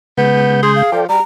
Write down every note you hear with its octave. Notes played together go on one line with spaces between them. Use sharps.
C#3 G#3 B3 G6
G#4 C6
F5
F3 A4 D5 G5
G3 G4 A#5